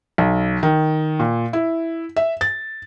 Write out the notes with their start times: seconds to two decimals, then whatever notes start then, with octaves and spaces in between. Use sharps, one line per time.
0.18 B1
0.63 D#3
1.20 A#2
1.53 E4
2.16 E5
2.41 A6